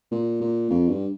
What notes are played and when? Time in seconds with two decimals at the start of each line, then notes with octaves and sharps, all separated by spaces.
0.11 A#2
0.41 A#2
0.70 F2
0.89 G2